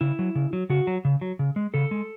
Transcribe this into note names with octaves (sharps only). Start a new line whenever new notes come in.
C#3 E4
F#3
C#3
F#3
C#3 F#4
F#3
C#3
F#3
C#3
G#3
C#3 A4
G#3